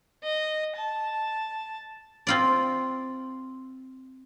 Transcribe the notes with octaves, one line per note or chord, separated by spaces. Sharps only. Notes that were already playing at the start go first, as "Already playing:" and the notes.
D#5
A5
C4 F4 D5